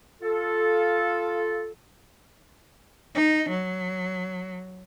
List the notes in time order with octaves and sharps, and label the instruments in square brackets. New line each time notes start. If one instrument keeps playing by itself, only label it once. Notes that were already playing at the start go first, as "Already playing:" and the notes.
[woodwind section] F4 A4
[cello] D#4
F#3